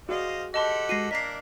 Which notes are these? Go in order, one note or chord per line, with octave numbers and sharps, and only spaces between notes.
F#4 G#4 C5 D5 D#5 F5
G4 A4 D#5 F#5 A5 C6
G#3 F#4 A#6 C7 D#7
A#3 D4 A#4 D#5 B6 C7